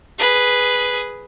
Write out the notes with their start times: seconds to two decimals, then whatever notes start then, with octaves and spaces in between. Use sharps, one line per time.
0.19 G#4 B4